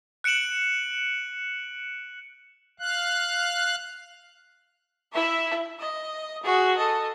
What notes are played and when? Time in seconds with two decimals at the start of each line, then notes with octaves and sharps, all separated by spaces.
0.24 F#6 C#7 D7 E7 F#7
2.79 F5 F#6
5.12 E4 E5
5.79 D#5
6.43 F#4 G#4
6.77 A4 D#5